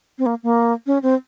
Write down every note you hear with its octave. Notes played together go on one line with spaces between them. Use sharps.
C4
A#3
A#3
C#4
C4